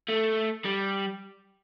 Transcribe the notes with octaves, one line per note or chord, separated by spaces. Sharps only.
A3
G3